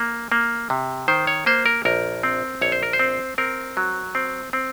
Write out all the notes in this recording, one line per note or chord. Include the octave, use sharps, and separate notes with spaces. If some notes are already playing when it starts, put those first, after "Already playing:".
Already playing: A#3
A#3
C3
D#3 C5
C#5
A#3 C5
A#4
A#1 A#4
C4
A#1 C#5
C5
A#4
C5
C4
C4 A#4
F#3
C4
C4